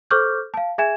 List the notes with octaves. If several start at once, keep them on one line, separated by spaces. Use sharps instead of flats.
A4 C5 C#6 D6 F6 G6
F5 A5
G#4 E5 G#5 G#6 E7